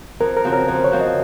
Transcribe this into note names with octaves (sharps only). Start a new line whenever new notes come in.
F2 A#4
A#4
C#3 F3 C4 F#4
A#4
F2 C5
C#5
C#3 F3 C4 F#4
D#5